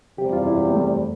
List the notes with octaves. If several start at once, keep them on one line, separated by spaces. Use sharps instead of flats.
E2 C3 G3 G4
F4
E4
B3
A3